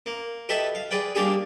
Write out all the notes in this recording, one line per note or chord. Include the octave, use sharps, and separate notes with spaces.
A#3
G4 A4 B4 D#5 E5 B5
F5
G#4 B4 D5 G5
G3 A#3 D4 G4 G#4